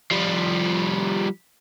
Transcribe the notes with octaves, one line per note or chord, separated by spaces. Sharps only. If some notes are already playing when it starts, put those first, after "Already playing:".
F3 G3